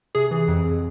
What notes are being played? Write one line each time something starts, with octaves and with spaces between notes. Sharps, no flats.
C3 G#4
E3
F2
F2